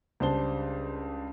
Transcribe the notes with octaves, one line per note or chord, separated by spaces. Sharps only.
C#2 G3 D4 C5 A5 G7